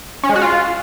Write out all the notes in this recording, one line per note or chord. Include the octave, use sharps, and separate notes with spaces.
C#4
G#3
F#4
F4